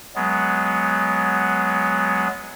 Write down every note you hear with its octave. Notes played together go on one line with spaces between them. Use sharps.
F#3 G#3 B3